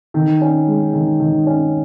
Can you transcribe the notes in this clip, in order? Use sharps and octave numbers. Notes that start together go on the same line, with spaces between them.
D#3
C#4
G#3
D#3
D#3
C#4